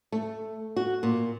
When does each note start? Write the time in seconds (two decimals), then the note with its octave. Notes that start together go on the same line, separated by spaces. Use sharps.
0.12 A3
0.76 F#4
1.03 A#2